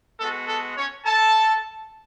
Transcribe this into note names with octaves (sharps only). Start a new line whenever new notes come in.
G#3 B3 F#4 A4
A4
C#4 C#5
A4 A5